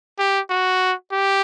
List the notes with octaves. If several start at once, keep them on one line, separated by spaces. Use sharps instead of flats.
G4
F#4
G4